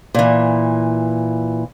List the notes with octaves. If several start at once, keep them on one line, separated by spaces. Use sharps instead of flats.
A#2 E3